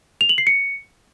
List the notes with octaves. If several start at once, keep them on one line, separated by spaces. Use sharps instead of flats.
F7
F#7
C7
C#7